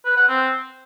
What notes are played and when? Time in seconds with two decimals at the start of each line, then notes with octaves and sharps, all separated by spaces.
0.05 B4
0.17 F#5
0.29 C4